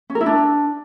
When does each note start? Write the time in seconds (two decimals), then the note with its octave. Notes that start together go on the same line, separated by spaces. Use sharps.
0.10 C#4
0.15 A#4
0.21 E4
0.26 D4